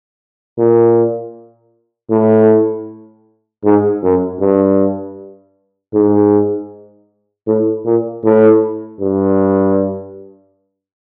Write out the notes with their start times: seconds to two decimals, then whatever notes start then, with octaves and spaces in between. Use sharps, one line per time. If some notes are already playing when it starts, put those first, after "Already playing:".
0.58 A#2
2.11 A2
3.65 G#2
4.03 F#2
4.40 G2
5.94 G#2
7.47 A2
7.85 A#2
8.24 A2
9.00 G2